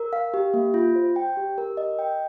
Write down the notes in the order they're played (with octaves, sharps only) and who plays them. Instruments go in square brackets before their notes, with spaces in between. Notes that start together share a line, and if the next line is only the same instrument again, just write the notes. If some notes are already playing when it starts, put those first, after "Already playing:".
Already playing: [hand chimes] A#4
F5
G4
A#3
F4
C5
G5
G4
A#4
D#5
G5